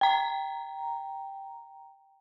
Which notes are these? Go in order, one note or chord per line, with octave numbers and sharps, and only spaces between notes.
G5 A#5